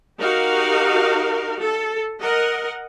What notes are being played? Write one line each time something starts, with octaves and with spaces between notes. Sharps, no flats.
D#4 F#4 G4 A#4 F5
A4
A#4 D#5 F#5